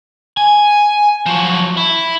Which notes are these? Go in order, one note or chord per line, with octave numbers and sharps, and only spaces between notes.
G#5
F3 F#3
E4